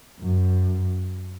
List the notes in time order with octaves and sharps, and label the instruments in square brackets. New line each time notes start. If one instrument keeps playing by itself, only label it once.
[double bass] F#2